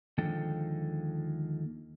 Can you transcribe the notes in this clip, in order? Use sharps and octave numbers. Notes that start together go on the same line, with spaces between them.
D#2 D3 F3 G#3 A4 G5